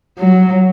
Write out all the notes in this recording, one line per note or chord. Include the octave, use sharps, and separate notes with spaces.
F#3